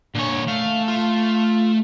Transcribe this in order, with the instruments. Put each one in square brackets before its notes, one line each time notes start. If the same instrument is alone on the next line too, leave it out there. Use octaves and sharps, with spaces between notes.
[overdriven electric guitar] A#2 C#5 [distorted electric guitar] D3 G#5
[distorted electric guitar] A3 [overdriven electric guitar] F5
[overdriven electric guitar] F4